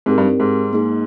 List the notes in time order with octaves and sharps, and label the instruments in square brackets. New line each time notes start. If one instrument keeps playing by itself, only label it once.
[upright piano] G#2 [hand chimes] C4 D#4 G4 A#4
[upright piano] G2
G#2
[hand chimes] A#3 D#4 G#4